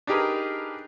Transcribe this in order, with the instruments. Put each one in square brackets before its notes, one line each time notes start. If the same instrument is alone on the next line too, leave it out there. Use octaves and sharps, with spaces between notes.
[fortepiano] D4 D#4 G4 G#4 A#4 B4